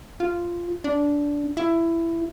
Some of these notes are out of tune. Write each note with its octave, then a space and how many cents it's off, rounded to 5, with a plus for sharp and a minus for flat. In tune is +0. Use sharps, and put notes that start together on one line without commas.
F4 -10
D4 -15
E4 +15